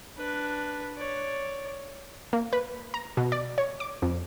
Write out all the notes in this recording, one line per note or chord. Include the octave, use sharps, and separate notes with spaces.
D4 B4
C#5 D5
A#3
B4
A#5
B2
D5
C#5
D6
F2